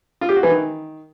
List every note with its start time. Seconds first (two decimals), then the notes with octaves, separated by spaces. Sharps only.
0.21 F4
0.29 G4
0.36 F#4
0.43 E3
0.50 D#3